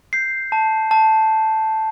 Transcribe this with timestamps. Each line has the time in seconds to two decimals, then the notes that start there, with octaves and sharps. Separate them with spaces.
0.13 G6 C7
0.52 A5
0.91 A5